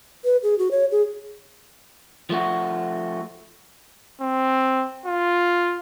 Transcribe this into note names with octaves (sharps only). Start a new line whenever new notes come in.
B4
G#4
F#4
C#5
G#4
F3 A3 F#4
C4
F4